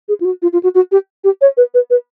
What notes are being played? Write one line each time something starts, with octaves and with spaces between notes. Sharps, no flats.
G#4
F4
F#4
F4
F4
F#4
F#4
G4
G4
C#5
B4
B4
B4